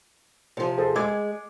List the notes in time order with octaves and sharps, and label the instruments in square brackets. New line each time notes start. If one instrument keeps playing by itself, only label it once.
[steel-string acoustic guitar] C3 F3
[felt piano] G#4 A4 C5
[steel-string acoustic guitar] G#3 [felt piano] D6 G#6